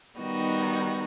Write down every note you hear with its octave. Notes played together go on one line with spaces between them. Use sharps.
D#3 G3 B3 D#4 F#4